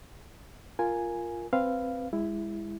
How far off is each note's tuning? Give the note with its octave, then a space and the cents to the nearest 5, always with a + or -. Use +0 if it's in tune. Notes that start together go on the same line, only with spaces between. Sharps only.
F4 +0 A#4 +0 G#5 +0
C4 +0 B4 +0 F5 -5
G#3 -30 E4 +5